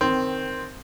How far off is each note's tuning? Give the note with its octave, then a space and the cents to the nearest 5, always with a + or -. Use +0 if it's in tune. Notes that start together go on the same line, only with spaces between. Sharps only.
D#3 +0 C4 +0